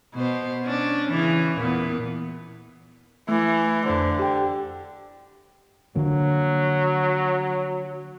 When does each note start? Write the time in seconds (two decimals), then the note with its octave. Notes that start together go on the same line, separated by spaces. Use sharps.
0.14 B2 C5
0.64 C#4 D4
1.10 C#3 E3
1.56 E2 A#2 B3
3.29 E3 A3
3.86 F2 D3 C5
4.19 G4 G5
5.96 D3 F3 F#3 A#3